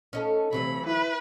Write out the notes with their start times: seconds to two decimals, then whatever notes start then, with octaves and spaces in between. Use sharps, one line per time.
0.13 C#4 D#4 A4
0.53 D2 C3 E3 F#3 B5
0.87 E4 B4